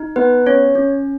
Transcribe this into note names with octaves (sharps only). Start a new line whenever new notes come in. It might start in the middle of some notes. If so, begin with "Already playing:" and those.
Already playing: D#4
B3 B4
C#4 C#5
C#4